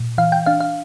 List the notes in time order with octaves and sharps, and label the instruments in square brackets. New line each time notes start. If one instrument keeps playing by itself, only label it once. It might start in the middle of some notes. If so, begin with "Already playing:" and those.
Already playing: [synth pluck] A#2
E3 F5
G5
D4 F5
F5